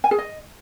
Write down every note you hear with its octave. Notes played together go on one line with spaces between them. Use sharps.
G#5
G#4
D#5